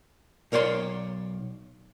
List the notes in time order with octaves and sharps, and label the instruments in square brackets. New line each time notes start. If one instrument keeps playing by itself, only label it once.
[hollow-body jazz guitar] B1 A#4 C#5 D5 C6